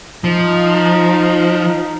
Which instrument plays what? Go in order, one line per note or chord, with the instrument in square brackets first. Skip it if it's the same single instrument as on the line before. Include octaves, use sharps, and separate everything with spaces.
[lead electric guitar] F3 [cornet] D#4